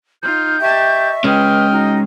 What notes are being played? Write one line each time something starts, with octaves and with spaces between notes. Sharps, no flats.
D#4 F4 F6 G6
G4 D#5 E5 A5 C#6
G#3 C#4 B4 D#5 G5 F6
D#4 F#4